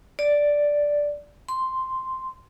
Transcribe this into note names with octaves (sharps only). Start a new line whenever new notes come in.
D5
C6